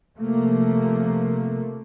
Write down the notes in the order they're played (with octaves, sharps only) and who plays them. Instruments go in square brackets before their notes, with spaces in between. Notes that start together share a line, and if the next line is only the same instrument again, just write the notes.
[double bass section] C3 F3 A3 A#3